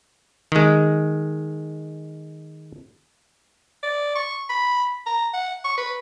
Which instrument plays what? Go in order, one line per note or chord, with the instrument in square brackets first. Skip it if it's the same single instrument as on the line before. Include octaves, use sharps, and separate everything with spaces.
[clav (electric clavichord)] D#3 G#3
[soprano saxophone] D5
C#6
B5
A#5
F#5
C#6
B4